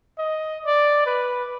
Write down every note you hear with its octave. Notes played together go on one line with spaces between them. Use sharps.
D#5
D5
B4